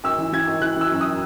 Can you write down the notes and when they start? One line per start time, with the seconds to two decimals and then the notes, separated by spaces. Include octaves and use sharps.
0.04 G#1 E6
0.18 E3
0.32 E3 G#6
0.47 G#1
0.61 E3 F#6
0.77 E3 E6
0.91 F#2
1.01 D#6